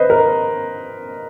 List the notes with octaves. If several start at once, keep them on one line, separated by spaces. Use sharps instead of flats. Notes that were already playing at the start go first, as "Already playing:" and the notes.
Already playing: B4 C5 D#5
A#4